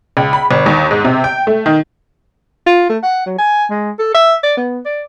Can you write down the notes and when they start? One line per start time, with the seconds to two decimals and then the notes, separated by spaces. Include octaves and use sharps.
0.17 C#2
0.33 B5
0.51 G1
0.66 D#2
0.91 G#2
1.05 C3
1.24 G5
1.47 A3
1.66 D#3
2.66 F4
2.89 A3
3.03 F#5
3.26 F#3
3.38 G#5
3.70 G#3
3.99 A4
4.14 E5
4.43 D5
4.57 B3
4.86 D5